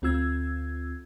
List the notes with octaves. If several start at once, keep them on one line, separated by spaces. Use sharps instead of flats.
D2 C4 F4 E6 G#6